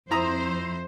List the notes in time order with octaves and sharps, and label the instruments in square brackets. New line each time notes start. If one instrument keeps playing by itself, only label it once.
[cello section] F2 C5 [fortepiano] E4 A#5 D#6